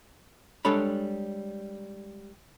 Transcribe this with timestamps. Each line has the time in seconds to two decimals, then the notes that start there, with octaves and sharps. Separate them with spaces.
0.65 G3 G#3 D4 A4 C#5 B5